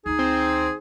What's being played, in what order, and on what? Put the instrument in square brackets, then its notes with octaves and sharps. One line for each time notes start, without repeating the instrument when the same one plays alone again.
[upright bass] D2 D#3 [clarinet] D#4 [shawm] G#4
[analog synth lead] C4